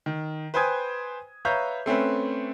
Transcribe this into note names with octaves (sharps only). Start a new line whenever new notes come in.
D#3
B4 C5 G5 G#5 D#6 G#6
B4 C#5 E5 F5 A#5 G6
A3 C4 C#4 B4